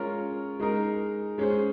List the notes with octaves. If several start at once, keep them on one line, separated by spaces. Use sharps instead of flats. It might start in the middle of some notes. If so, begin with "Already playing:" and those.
Already playing: G#3 C#4 F4 A#4 C#5
G#3 D#4 A#4
G#3 C#4 G#4 C5